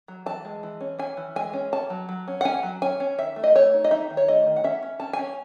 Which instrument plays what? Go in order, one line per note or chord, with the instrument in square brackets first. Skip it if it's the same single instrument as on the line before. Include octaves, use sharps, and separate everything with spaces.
[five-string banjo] F#3
E3 A5
G#3
E3
C#4
C#4 G#5
E3
G#3 G#5
C#4
C#4 A5
F#3
F#3
C#4
F#5
C#4 G#5
F#3
C#4 G#5
C#4
D#3 E5
A3
D#5
A3 C#5
D#4
D#5
D#4 E5
D#3
C#5
A3 D#5
D#3
F#5
C#4 E5
C#4
C#4 A5
G#5
C#4